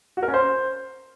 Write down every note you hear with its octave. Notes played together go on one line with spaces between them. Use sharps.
F#4
A#4
C#4
C5